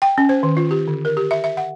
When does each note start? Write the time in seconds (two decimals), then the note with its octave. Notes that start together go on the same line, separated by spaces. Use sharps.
0.02 G5
0.18 C#4
0.29 C5
0.43 D#3
0.57 F4
0.71 G4
0.88 D3
1.05 A#4
1.17 G4
1.31 E5
1.44 E5
1.57 F#5